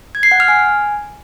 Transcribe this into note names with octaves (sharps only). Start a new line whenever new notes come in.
G#6
C7
F#5
F6
G#5